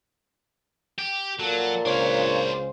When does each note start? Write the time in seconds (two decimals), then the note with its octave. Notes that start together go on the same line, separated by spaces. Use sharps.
0.98 G4
1.39 A#2 F#3 A4
1.85 C#2 C#3 D4 C5 C#5 F5